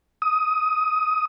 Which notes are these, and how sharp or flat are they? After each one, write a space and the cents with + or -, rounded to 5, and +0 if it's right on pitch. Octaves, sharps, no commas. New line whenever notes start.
D#6 +15